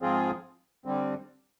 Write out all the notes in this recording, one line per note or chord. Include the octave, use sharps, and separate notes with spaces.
G#2 F3 C4 F4 G#4
D3 G3 C4